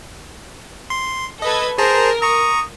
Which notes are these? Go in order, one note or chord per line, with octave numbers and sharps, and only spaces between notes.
C6
A4 B4 D#5 G#6
G#4 A#4 C5 A5 A#5
A#5 C#6 D#6